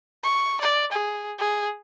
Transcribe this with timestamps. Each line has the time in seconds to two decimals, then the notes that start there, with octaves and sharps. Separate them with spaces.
0.24 C#6
0.61 D5
0.92 G#4
1.39 G#4